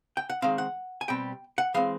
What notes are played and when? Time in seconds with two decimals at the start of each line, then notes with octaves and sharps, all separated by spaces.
0.17 G5
0.30 F#5
0.42 D#3 G#3 C4 F5
0.58 F#5
1.01 G#5
1.08 B2 G3 C4 G5
1.58 F#5
1.74 E3 G#3 C4 F5